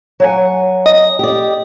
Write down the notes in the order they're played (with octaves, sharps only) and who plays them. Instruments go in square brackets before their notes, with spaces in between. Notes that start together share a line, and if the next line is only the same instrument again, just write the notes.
[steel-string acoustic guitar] F#3 F#5 G#5
[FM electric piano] D#5
[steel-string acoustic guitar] G4 D5